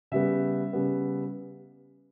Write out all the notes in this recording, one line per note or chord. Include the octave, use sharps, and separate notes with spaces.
C#3 G3 B3 E5
C#3 G3 B3